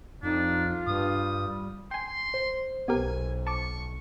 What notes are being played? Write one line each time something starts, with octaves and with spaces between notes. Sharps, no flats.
F2 D4 D#4 F4
G2 G3 D#6
G5 G#5 C6
C5
B1 B3 G4 A#4 G#5
A5 C#6 D6 C#7